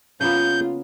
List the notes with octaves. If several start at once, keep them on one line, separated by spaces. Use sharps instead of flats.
C#3 A#3 B3 F4 G6